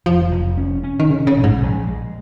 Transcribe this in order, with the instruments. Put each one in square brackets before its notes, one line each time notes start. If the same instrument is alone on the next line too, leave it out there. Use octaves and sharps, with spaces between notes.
[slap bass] F1 [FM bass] F3
[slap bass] F1
C#4
C#4
[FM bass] D#3
[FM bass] C#3 [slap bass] C#4
[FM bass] C#3
[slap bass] A#1
[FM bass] G#2
[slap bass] A#1
G#3